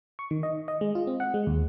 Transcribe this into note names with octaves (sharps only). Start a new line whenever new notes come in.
C#6
D#3
D#5
D#5
G#3
F4
C4
F#5
G#3
D#2